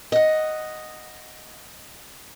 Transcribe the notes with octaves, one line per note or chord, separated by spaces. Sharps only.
D#5 F#5